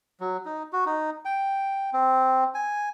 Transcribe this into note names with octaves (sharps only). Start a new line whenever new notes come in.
F#3
D#4
F#4
D#4
G5
C4
G#5